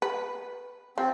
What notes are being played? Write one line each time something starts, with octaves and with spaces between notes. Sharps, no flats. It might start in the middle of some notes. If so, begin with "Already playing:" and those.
B4
F3 C4